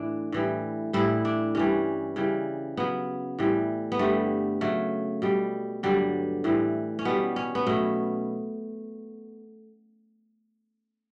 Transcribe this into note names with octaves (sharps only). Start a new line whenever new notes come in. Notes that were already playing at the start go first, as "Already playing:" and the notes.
Already playing: A2 E3 D4
A2 E3 G3
A2 E3 G3 E4
D4
G2 E3 G3 C#4
C#3 E3 G3
C#3 F#3 B3
A2 E3 G3
B3
G2 D3 G3 A3
C#3 F#3 A3
B2 G3
G2 D3 F#3 G3
A2 E3 G3
C#4
B2 G3 B3
C#4
B3
B2 F#3 A3